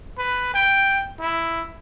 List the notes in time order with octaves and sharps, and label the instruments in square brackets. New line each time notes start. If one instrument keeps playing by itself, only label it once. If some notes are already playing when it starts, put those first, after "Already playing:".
[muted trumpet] B4
G5
E4